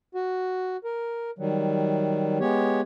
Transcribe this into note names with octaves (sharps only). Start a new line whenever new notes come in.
F#4
A#4
D#3 F#3 G3
G#3 B3 G4 C#5